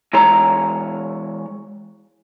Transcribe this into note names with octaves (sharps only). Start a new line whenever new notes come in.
E3 G#3 C#5 A#5